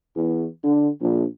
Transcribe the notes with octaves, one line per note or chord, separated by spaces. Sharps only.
E2
D3
A#1